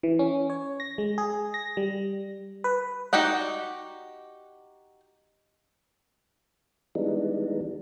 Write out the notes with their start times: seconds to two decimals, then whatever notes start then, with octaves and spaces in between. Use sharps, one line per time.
0.03 E3
0.19 C#4
0.50 C#5
0.80 A#6
0.98 G#3
1.18 G#4
1.54 A#6
1.77 G3
2.64 B4
3.13 D#4 F#4 G4 D5 F#5
6.95 E3 G3 G#3 B3 D4 D#4